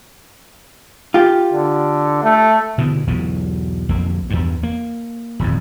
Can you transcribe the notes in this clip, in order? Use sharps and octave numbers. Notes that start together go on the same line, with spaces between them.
F4 G4
D3
A3
B2 D3 E3
B1 E2 E3 F#3
B1 F2 A#3
E2 G2
A#3
D#1 F2 G#2